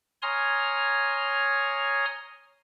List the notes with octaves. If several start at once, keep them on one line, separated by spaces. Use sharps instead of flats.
C#5 G#5 A#5 C6 D#6 F6